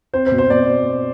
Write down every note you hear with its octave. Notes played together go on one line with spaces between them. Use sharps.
C4 C5
C5
B2
C5
B2 D5